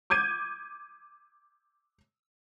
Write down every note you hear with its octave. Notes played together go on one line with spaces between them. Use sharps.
D6 G6 G#6 D#7